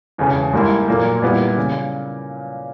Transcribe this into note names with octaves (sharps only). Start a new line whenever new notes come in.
E1 E2 C#3
G#2 G3 A#3 E4
B1 A#2 A#3
A#2 G3 B3 E4
C#3